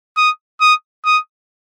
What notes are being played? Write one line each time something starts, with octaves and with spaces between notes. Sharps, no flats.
D#6
D#6
D#6